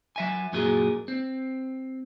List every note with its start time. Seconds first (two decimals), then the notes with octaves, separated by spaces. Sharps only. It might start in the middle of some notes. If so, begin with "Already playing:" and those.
0.16 F#3 E5 G#5
0.53 F#2 A#2 F#3 G#4 A#4
1.08 C4